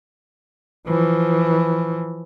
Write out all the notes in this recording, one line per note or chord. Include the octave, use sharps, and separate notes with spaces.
E3 F3